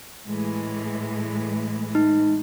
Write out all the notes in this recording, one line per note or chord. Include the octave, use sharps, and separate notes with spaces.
A2 E3 G#3
D#4